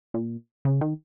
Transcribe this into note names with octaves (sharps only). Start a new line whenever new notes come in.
A#2
C#3
D#3